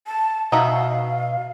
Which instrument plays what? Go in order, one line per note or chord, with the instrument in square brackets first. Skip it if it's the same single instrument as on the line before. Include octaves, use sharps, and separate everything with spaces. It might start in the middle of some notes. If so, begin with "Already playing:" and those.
[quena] A5
[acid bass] B2 [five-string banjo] D#4 F#4 E5 [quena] F5